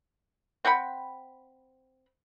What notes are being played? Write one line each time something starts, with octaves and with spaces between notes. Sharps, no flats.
C4 F#5 G5 B5